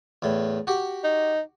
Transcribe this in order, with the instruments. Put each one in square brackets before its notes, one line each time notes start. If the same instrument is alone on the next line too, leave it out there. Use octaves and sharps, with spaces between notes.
[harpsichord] E2 A2
F#4 G4
[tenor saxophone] D#4